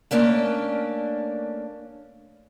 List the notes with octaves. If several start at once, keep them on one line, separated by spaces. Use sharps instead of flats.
A3 A#3 C#4 D4